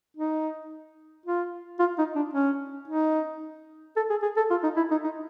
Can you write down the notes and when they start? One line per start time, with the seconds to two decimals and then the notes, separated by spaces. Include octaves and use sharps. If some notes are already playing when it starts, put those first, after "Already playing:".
0.17 D#4
1.26 F4
1.79 F4
1.99 D#4
2.16 D4
2.34 C#4
2.88 D#4
3.97 A4
4.10 G#4
4.23 G#4
4.37 A4
4.50 F4
4.63 D#4
4.77 E4
4.91 D#4
5.04 D#4